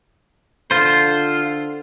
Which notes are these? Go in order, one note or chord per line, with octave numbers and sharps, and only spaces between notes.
D3 F4 C5